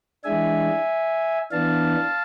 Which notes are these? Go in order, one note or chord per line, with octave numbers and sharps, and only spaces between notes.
E3 G#3 D4 E5 G#5
E3 B3 D4 F5 A5